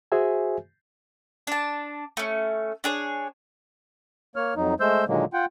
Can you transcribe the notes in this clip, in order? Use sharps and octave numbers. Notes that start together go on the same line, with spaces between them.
F#4 G#4 C5 E5 G#5
D4 A5
A3 C#4
D4 G#4 C#5
A#3 C#5 F6
F2 F#3 D#4
G#3 A3 C5 E6 G6
A#2 D3 D#3 F#3 G#3 A#3
F4 F#5 G5